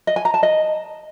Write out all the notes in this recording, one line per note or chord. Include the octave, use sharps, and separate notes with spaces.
D#5
G#5
A#5
A5
D#5